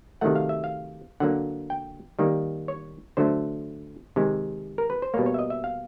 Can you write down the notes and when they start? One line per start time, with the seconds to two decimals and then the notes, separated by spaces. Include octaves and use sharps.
0.21 C3 D#3 F#3 A3 F#5
0.36 F5
0.49 E5
0.64 F5
1.20 D3 F#3 A#3 F#5
1.70 G5
2.19 D#3 G3 A#3
2.68 C#5
3.17 D3 F#3 A3 C5
4.16 C3 D#3 G#3
4.78 A#4
4.90 B4
5.02 C5
5.14 B2 G3 A#3 C#5
5.26 C#5
5.34 E5
5.39 D#5
5.50 E5
5.64 F5